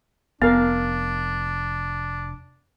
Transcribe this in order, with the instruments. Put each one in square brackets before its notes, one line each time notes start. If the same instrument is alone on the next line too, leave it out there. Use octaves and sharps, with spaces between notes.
[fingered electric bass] F1 [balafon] B3 [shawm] D4 [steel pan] A#4 F5